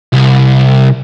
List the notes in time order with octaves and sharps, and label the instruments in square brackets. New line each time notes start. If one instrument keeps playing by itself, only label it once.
[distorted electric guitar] C2